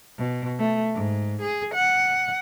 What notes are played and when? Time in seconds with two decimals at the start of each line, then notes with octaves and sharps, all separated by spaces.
0.18 B2
0.59 A3
0.94 G#2
1.42 G#4
1.74 F#5